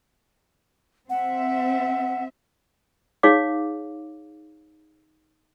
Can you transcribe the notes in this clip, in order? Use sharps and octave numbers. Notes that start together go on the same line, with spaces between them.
C4 E5 F#5
D#4 G#4 C#5 F5 D6